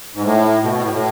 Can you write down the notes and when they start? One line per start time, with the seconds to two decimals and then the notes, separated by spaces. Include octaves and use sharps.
0.14 G#2
0.23 A2
0.63 B2
0.74 B2
0.83 A2
0.93 A2